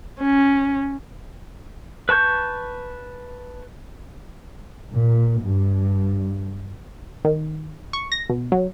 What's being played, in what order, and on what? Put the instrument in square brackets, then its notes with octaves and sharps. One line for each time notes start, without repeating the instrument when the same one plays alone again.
[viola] C#4
[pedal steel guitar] B4 A5 C#6 G6
[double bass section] A#2
G2
[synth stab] D#3
C#6
A#6
B2
F#3